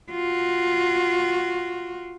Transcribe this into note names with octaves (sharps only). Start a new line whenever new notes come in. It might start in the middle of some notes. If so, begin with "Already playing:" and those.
F4 F#4